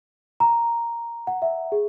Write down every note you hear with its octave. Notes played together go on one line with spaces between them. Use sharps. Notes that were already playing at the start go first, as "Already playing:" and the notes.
A#5
F#5
E5
G#4